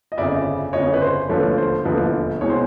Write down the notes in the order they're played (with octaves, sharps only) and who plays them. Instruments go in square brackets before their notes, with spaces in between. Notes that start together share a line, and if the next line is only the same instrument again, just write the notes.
[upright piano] D#5
G1 F2 C#3 D5 E5
G1 F2 C#3 C#5 D#5
B4
C5
E1 D#2 D3 F3 A3 B4 C#5
C5
E1 D#2 D3 F3 A3 B4
C2 B2 G#3 C#5
C5